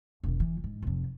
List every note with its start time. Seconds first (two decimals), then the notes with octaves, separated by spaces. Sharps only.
0.24 E1 D#3
0.40 E3
0.64 G#2
0.82 F1 F2